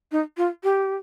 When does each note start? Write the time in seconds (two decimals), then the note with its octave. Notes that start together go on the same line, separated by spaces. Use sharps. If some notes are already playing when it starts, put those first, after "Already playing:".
0.12 D#4
0.37 F4
0.64 G4